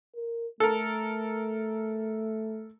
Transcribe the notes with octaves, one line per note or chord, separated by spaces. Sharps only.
A#4
A3 A4 A#4